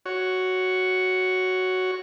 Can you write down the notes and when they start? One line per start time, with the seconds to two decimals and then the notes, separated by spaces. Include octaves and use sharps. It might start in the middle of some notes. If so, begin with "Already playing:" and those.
0.06 F#4 C#5